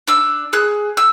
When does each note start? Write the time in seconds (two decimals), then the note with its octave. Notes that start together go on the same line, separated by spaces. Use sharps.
0.07 D4 E6
0.53 G#4 F#6
0.97 E6